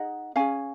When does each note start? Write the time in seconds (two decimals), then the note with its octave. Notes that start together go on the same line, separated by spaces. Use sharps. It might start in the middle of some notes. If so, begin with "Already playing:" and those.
Already playing: D#4 G#4 D#5 F#5
0.36 C#4 G#4 F5 G#5